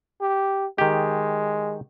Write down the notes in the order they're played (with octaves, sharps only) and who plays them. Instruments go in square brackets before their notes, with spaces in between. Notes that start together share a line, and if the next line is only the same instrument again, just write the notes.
[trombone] G4
[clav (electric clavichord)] D#3 G4 [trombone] G#3